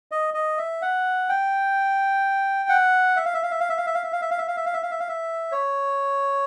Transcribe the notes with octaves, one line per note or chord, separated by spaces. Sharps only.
D#5
D#5
E5
F#5
G5
F#5
E5
F5
E5
F5
E5
F5
E5
F5
E5
F5
E5
F5
E5
F5
E5
F5
E5
F5
E5
F5
E5
F5
E5
C#5